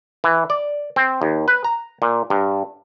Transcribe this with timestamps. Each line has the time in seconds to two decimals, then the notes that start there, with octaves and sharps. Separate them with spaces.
0.24 E3
0.50 D5
0.96 C4
1.22 D#2
1.48 B4
1.64 A#5
2.02 A#2
2.30 G2